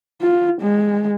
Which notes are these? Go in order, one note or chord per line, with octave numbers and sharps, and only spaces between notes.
F4
G#3